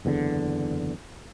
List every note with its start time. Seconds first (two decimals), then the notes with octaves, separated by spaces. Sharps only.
0.05 F#1 E2 A#2 D3